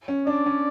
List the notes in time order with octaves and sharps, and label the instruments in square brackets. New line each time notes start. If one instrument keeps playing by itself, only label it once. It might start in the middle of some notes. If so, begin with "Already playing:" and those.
[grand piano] C#4
[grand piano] D4 [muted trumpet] D5
[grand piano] C#4